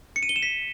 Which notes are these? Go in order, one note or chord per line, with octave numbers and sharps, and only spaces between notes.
C#7
D#7
G7
E7
B6